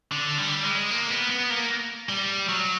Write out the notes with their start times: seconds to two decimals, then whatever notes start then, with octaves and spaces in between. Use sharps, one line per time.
0.12 D3
0.38 G3
0.65 G#3
0.90 A#3
1.10 B3
1.30 B3
1.50 A#3
2.09 G3
2.49 F#3